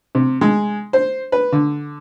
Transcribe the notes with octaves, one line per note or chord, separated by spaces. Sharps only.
C3
G#3
C5
B4
D3